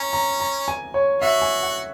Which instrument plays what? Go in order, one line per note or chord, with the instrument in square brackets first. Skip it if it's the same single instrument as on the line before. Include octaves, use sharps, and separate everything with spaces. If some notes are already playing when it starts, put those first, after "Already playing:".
Already playing: [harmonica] C#4 [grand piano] A#5
[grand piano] A#5
A#5
G#5
C#5
[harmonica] F#4 [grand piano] E5
[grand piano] G#5
F#5